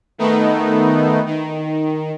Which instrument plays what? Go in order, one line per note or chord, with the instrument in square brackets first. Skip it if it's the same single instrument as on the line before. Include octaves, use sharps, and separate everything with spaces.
[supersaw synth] D#3 A3 B3 D#4
D#3